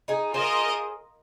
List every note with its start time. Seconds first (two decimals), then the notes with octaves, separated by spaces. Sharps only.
0.08 D#4 G#4
0.34 F4 G#4 A#4 C5 D#5